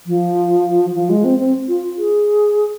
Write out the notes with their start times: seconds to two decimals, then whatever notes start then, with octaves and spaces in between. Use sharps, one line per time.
0.07 F3
0.95 F3
1.10 G#3
1.24 C4
1.39 C4
1.68 F4
1.98 G#4